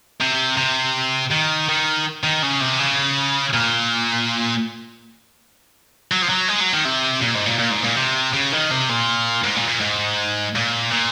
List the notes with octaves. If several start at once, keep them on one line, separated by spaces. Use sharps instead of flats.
C3
C3
D#3
D#3
D#3
C#3
C3
C#3
A#2
F#3
F3
F#3
G#3
F#3
D#3
C3
A#2
G#2
A#2
A#2
G#2
A#2
C3
C#3
D#3
C3
A#2
G#2
A#2
A#2
G#2
A#2
A#2